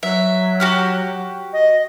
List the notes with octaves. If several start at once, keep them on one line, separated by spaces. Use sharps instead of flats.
F#3 E5
F#4 G4 F6
D#5